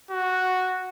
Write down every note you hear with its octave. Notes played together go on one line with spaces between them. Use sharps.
F#4